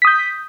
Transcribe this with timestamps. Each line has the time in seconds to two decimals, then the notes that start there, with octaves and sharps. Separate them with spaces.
0.02 B6
0.05 D#6
0.07 G6